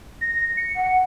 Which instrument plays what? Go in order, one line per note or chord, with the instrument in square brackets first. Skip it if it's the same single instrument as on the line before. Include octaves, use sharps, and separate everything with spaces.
[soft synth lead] A#6
C#7
[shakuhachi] F#5